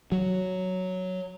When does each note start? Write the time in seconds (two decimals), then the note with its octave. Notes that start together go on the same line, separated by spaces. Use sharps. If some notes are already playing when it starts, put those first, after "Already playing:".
0.12 F#3